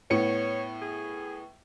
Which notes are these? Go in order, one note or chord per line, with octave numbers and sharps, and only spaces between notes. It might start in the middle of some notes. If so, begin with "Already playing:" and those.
A2 B3 C#5 C#7
G#4